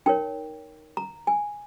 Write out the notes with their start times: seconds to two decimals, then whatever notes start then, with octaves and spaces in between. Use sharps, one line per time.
0.06 D#4 A#4 C#5 G5
0.97 A#5
1.27 G#5